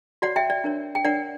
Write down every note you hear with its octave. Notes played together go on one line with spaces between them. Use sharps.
F#4 C#5 D5 F#5
E5 G5
D5
D4 A#4 C#5
G5
D4 A#4 C#5 D5 F#5